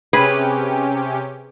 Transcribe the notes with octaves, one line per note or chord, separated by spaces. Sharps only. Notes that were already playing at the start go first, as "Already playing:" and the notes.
C3 C#4 G4 G#4 B4